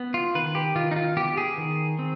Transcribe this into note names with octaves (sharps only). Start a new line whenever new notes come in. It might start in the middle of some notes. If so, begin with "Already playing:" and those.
Already playing: B3
F4
D#3 B4
G4
D#3 F4
D#4
F4
B3 G4
G#4
D#3
C4